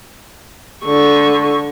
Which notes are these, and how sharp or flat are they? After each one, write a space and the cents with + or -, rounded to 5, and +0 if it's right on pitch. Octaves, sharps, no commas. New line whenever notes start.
D3 -10 C#6 -5